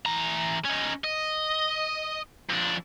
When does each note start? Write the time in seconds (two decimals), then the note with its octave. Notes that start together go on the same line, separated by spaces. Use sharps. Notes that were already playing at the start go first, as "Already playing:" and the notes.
0.06 E3 A#5
0.65 C#4 D#4
1.04 D#5
2.49 F2 D4